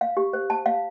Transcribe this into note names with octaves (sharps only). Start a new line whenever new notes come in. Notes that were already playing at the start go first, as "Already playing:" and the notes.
F5
G4
C5
A5
F5